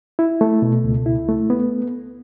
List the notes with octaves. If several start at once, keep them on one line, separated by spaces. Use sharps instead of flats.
E4
A3
B2
C#2
E4
A3
B3